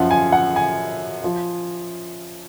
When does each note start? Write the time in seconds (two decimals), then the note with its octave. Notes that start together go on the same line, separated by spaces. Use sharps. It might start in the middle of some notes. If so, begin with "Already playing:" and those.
Already playing: F#2 F3 F#5
0.11 G#5
0.32 F#5
0.56 G#5
1.24 F3